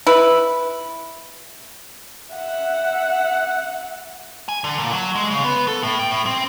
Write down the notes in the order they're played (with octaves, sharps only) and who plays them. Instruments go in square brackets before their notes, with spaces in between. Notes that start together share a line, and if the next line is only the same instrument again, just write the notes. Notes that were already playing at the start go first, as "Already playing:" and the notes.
[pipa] E4 B4
[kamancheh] E5 F#5
[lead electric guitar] G#5
D3
A#2
F#3
G#3
C#3
B3
A4
A2
G5
A2
C4